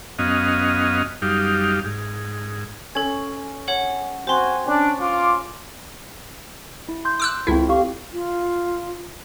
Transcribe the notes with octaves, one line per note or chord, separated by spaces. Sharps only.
F#2 B3 C#4 D#5 F5
F#2 G3 D#4 G4 F5
G#2
C#4 A4 G#6
C#5 F#5 F#7
C4 F#4 C5 G#5 C6
C#4 D4
F4 D6
E4
C6 G6
D6 E6 F#6
C#2 C4 E4 F4 A4
G4 F5 C#6
F4